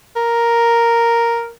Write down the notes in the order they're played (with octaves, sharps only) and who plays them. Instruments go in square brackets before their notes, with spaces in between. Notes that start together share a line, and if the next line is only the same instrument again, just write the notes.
[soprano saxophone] A#4